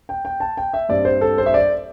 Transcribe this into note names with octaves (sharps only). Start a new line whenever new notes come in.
G5
G5
A5
G5
E5
G2 G3 C4 D5
C5
A4
C5
E5
D5